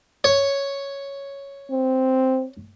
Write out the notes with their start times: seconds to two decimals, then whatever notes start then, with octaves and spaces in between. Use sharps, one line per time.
0.24 C#5
1.71 C4